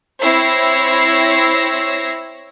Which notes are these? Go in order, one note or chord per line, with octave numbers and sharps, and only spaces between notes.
C4 E4 C#5 E6 A#6 C7